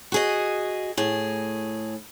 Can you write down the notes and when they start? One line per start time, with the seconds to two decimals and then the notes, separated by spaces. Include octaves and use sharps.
0.12 F#4 G#4 D#5
0.97 A2 G#4